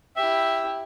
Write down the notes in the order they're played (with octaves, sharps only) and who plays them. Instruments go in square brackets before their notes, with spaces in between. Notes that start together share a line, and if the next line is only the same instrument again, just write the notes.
[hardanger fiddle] E4 G4 [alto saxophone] E5